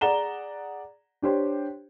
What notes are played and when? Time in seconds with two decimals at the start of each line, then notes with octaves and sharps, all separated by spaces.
0.01 G#4 D5 F#5 A#5 E7 G7
1.22 D4 G4 C5 C#5